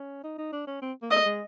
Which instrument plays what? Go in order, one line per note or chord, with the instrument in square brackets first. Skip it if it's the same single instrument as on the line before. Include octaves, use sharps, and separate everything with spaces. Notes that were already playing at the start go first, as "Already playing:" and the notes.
Already playing: [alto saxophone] C#4
D#4
D#4
D4
C#4
C4
A#3
[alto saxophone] A3 [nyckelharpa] D#5
[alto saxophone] G#3